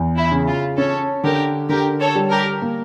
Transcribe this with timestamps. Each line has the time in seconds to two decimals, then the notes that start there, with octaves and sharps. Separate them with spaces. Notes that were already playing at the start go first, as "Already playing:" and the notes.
Already playing: E2
0.17 E4
0.31 C#3
0.48 F4
0.78 C#4 A4 C#5
1.24 D3 G4 A#4
1.69 D3 G4 A#4
2.00 A4 C#5
2.15 G3
2.31 G4 A#4
2.62 A#3